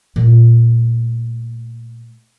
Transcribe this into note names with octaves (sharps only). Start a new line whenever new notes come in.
A#2 A3